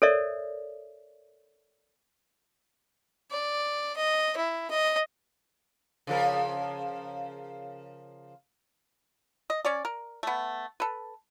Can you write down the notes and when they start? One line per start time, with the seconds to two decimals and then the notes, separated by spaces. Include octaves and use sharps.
0.02 A4 A#4 C#5 D5 E5
3.31 D5
3.97 D#5
4.37 E4
4.71 D#5
6.07 C#3 F3 A#4
9.50 D#5
9.65 C#4 C#5 D5
9.85 A#4
10.23 A3 B3
10.80 A4 B4